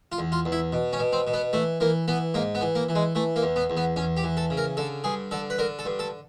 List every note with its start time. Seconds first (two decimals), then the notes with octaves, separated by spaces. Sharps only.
0.12 F4
0.18 E2
0.32 F4
0.45 E2
0.52 E4
0.73 B2
0.93 C#4
1.00 B2
1.13 C4
1.27 B2
1.33 B3
1.53 E3 A3
1.80 E3 A#3
2.08 E3 B3
2.34 G#2 A#3
2.55 B3
2.61 E3
2.75 A#3
2.89 E3
2.95 G#3
3.15 E3 A3
3.36 A#3
3.43 E2
3.56 B3
3.70 E2
3.77 B3
3.96 E2 C#4
4.17 G4
4.24 E3
4.37 A4
4.50 C#3
4.57 A#4
4.77 D3 A4
5.04 G2 G#4
5.31 D3 A4
5.50 B4
5.59 D3 A#4
5.79 A4
5.85 G2
5.99 A4